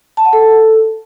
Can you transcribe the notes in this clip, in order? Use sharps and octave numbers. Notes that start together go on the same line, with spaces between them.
A5
F#5
A4